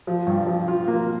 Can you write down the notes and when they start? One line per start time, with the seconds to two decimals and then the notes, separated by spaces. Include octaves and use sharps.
0.07 F3
0.27 G2
0.47 F3
0.68 F4
0.88 A#3